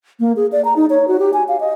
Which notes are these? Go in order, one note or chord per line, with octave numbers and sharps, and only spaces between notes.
A#3
G#4
D5
A#5
D#4
C#5
F#4
G4
G#5
F5
D#5